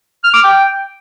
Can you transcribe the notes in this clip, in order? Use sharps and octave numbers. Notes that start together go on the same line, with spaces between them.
F6
D6
G5